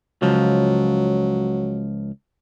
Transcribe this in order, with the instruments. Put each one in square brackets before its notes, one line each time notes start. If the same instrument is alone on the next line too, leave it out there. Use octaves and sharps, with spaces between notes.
[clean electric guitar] C#2 F3 [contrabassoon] F#3